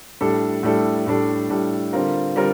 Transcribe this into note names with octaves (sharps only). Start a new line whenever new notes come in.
A2 G3 D4 A4
A2 G3 D4 A4
A2 G3 D4 A4
A2 G3 D4 A4
D3 G3 C4 F4 A#4
D3 G3 C4 F4 A#4